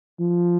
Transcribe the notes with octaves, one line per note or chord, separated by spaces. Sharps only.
F3